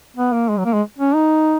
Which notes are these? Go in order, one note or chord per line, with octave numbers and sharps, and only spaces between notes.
B3
A#3
G#3
F#3
A#3
G#3
C#4
D#4